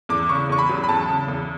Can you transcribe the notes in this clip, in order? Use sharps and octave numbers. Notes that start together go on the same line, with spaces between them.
E2 D6
C#3 C#6
E2 C#6
B5
F#3
B5
E2 A5
C#3
E2